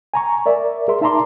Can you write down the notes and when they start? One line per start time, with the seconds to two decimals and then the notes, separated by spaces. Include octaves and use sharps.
0.14 G#5 A#5 C#6
0.46 A#4 D5 E5
0.88 G#4 A#4 E5 C6
1.01 D#4 E5 A5 A#5 C6 D6